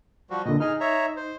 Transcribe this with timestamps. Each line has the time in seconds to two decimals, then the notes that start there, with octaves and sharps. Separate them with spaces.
0.30 F3 G3 F#4
0.46 A#2 D3 D#5
0.60 D#4 G#4 D#5 F6
0.80 C#5 E5 A#5
1.17 C5